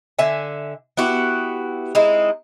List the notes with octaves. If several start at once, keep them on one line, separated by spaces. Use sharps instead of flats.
D3 E5 G#5
B3 E4 F#4 G4
G#3 C4 D#4 E4